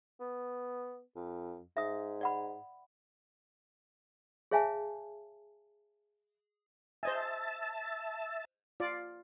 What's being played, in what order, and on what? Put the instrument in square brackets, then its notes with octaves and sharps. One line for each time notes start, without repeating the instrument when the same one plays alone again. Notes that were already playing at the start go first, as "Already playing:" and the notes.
[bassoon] B3
F2
[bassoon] G#2 [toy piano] E5 D#6
[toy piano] D5 F#5 B5
G#4 C#5 E5 F5 G#5 A5
[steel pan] C5 D#5 G#5 [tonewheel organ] E5 A5
[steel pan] F4 D5